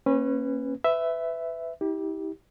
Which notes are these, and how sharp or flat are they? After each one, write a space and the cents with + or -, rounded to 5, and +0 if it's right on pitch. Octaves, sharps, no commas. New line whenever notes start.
A#3 +0 C#4 -25 B4 +5
B4 +25 E5 +0
E4 -45 G4 +0